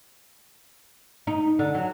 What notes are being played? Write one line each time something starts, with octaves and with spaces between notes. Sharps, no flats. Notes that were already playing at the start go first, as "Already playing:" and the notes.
D#4
D3
F#3